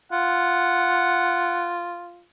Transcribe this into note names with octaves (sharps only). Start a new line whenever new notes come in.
F4 F#5